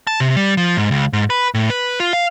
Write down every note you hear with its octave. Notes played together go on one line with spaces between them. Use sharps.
A5
C3
G3
F3
G#2
C#2
G#2
B4
A2
B4
F4
F5